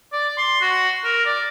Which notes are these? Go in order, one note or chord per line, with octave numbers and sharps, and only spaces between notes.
D5
C6
F#4
A#4
D5